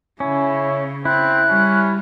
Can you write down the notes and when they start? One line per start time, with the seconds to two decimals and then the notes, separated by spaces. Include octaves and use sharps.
0.20 C#3 C#4 E4
1.05 C4 E4 F#6
1.49 G3 C#4